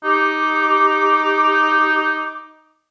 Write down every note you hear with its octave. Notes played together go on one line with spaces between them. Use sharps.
D#4 G4 D6